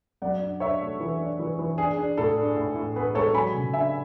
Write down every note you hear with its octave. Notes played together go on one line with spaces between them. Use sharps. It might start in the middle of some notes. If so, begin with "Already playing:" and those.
F#2 D5 F#5
D4
D4 C#5 E5
A3
E3
D4
E3
E3
D4 G#4
D4
A2 A4
D4
A2
A2
B3 G#4 B4
G#3 A4 C#5
F#3 G#5 B5
C#3
D4 E5 G#5